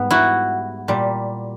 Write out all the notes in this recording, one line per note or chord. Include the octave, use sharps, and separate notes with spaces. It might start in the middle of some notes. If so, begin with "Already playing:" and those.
Already playing: G#2 G3 B3
E4 F#4
A#2 G3